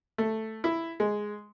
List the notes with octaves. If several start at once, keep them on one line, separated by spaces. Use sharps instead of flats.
A3
E4
G#3